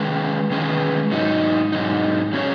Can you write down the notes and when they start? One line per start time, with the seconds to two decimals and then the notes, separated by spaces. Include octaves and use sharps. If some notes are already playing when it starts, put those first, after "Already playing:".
Already playing: D#3 G#3 C#4 G#4 B4
0.51 D#3 G#3 C#4 G#4 B4
1.11 G#2 F#3 D#4
1.72 G#2 F#3 D#4
2.33 F#3 C#4 G#4 C#5